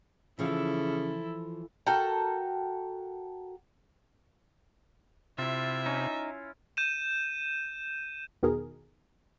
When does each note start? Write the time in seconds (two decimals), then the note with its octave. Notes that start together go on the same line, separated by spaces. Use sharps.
0.39 C#3 E3 F3 E4 F4 A4
1.87 F#4 A4 A#4 G5
5.38 C3 E4 F4 E5
5.86 C#4 D#4
6.77 G6 D#7 E7
8.43 E2 B2 D#3 G#4 A#4